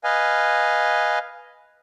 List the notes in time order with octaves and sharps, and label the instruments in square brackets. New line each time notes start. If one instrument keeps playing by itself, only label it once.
[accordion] B4 D#5 F5 G#5